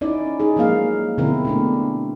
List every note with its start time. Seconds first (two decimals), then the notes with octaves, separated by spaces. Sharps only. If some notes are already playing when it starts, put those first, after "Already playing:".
0.01 C#4 D#4 E4 D5
0.40 D#4 G#4
0.56 F3 F#3 G#3 A#3 F5
1.18 B2 D3 F3 C4 E4 A#4
1.45 B2 A3 D4